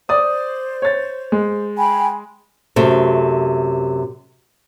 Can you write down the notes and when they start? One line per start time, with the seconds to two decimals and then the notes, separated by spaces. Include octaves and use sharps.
0.09 C5 D5 D#6
0.82 C#5 A6
1.32 G#3
1.77 G5 G#5 B5
2.76 F#2 C3 A3